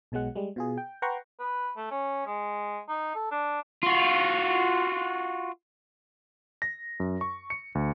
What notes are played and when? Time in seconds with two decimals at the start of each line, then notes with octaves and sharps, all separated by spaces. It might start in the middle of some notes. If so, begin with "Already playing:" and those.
0.12 B1 B2 F#3 G#3 F#5
0.35 G3 G#3
0.56 B2 F4 G#4
0.78 G5
1.02 B4 F#5 G5 A#5 C6 C#6
1.39 B4
1.77 A3
1.91 C#4
2.26 G#3
2.88 D#4
3.15 A4
3.31 D4
3.83 F4 F#4
6.62 A#6
7.00 F#2
7.21 C#6
7.50 C#7
7.75 D2